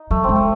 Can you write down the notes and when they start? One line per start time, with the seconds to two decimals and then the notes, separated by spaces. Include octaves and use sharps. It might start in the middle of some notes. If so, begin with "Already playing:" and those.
Already playing: D#4
0.11 F#3 A3
0.24 C4
0.29 G#3
0.36 A3